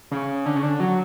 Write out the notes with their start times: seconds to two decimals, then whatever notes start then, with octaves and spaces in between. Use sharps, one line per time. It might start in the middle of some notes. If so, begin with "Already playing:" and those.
0.11 C#3
0.46 D3
0.56 C#3
0.63 D3
0.80 F#3